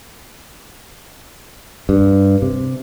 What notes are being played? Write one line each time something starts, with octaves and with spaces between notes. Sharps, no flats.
G2
C3